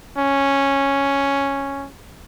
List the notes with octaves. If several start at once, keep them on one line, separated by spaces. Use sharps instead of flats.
C#4